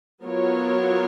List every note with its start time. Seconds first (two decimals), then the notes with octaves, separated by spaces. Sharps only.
0.23 F#3 B3 F4 A#4 C#5